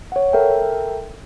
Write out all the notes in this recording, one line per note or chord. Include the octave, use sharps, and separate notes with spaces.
C#5 F#5
A4 A#4 E5 G5